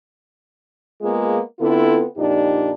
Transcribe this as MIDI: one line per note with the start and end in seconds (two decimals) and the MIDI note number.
1.01 1.39 56
1.01 1.39 58
1.01 1.39 59
1.01 1.39 65
1.01 1.39 68
1.60 2.04 50
1.60 2.04 59
1.60 2.04 60
1.60 2.04 64
1.60 2.04 65
1.60 2.04 69
2.17 2.71 41
2.17 2.71 46
2.17 2.71 62
2.17 2.71 63
2.17 2.71 67